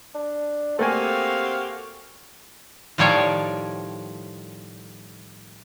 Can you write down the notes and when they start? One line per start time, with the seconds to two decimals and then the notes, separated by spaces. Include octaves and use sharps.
0.15 D4
0.79 A3 A#3 C4 F#4 G4 F5 G#5
2.98 A2 D#3 F3 G3 C#5 D5